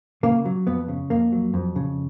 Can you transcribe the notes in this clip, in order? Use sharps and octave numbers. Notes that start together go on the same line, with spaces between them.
C#3 A#3
F#3
F2 B3
C#3
F2 A#3
F#3
F2
C#3